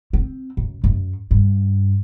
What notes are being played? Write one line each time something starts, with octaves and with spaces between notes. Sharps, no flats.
C4
F#2
F#2
G2